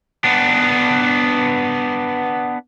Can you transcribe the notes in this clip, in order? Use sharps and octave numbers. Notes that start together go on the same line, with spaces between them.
B3 D4